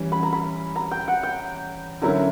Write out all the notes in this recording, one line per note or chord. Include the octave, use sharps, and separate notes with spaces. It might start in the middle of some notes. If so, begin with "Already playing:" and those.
Already playing: E3 G3 C#4
B5
A#5
B5
A#5
G5
F#5
G5
D3 F#3 C#4 E4 A#4 A#5